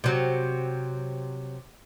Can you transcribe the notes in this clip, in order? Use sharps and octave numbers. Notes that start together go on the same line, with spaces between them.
C3 F#3